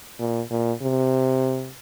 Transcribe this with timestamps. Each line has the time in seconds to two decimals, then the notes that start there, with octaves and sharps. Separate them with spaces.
0.19 A#2
0.50 A#2
0.82 C3